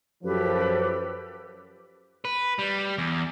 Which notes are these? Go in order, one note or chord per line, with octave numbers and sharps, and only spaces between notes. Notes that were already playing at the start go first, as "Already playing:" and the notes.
F#2 F3 G4 A4 B4
B4
G3
E2